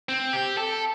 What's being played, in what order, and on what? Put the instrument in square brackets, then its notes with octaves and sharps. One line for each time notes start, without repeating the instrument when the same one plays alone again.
[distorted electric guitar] C4
G4
A4